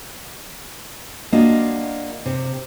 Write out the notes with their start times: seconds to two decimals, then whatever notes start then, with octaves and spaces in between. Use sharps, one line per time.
1.32 A#3 D4 F4 F#4 D#5
2.26 C3